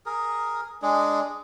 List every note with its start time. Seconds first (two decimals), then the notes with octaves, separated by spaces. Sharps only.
0.06 G#4 A#4
0.82 G#3 D4 G#4